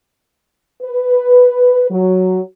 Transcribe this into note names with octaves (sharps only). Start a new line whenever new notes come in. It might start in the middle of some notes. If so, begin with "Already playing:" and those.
B4
F#3